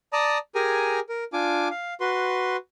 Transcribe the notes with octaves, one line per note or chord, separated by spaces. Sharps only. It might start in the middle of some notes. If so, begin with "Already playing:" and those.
D5 A5 A#5 D#6
G4 G#4 A#4 G#5 A#5
A#4
D4 F4 G#5 D6
F5
F#4 B4 C6